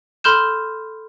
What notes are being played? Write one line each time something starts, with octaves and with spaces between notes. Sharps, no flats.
A4 B5 C6 F6 G6 E7